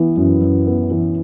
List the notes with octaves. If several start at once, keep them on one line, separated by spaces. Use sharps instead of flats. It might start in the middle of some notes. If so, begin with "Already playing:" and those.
Already playing: E3 B3
F#2
F#2
B3
E3